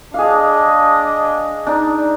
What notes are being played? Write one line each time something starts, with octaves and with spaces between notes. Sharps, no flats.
D4 G#4 D#5 F5
D4 D#4